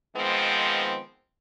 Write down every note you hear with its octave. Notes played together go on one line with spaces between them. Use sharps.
D#3 F3 G#3 B3 C4